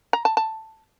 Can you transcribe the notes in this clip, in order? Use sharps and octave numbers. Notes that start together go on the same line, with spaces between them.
A#5
A5
A5